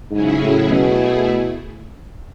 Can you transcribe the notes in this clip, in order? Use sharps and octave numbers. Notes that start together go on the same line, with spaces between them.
G#2 C#3 F#3 C#4 E4 G#4
A2
B2 A3 E4 G#4